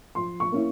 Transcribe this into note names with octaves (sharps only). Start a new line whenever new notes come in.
F3 C6
C#6
A#3 C#4 E4